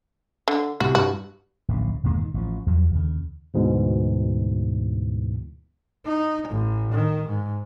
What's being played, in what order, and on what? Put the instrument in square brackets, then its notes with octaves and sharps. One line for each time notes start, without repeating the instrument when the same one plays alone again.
[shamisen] D3
[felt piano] C2 [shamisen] F#4
[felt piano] G2 [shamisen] F#4
[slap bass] D1 A#1 C#3
G1 D#2 A#2 G#3
D#3
A1 F3
E2 F3 F#3
D#2 C#3
[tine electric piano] D2 G#2 B2 E3
[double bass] D#4
A1
D#3
G#2